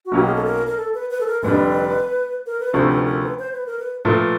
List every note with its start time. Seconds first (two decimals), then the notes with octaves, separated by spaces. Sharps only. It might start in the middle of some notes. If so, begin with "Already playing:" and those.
0.06 F#4
0.12 B1 B2 F#3 A#3 C#4 G4
0.25 G#4
0.35 A4
0.45 A#4
0.67 A#4
0.77 A4
0.94 B4
1.10 B4
1.20 A4
1.27 A#4
1.43 F1 F2 D3 G3 B4
2.46 A#4
2.60 B4
2.73 D2 C3 F3 A3 C#4 C5
2.90 B4
3.06 A#4
3.23 B4
3.39 C5
3.53 B4
3.66 A#4
3.79 B4
4.05 A#2 F3 A3 B4